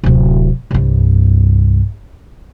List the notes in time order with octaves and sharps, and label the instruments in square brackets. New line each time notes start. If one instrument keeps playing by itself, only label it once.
[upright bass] D1 C3
C2 G2